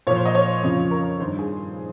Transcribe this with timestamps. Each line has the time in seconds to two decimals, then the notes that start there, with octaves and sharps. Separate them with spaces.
0.07 A#2 C#5
0.11 F3
0.16 C5
0.25 D#5
0.35 C#5
0.63 F2 C#3 F3
0.91 A#4
1.19 G2 D#3 C5
1.39 G#4